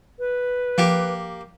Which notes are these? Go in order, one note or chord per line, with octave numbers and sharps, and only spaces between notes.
B4
F3 A#3 G4